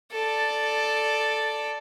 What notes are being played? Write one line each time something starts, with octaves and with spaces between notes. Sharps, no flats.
A4 D5